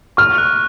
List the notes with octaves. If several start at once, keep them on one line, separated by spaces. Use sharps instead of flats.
C#6 F6
F#6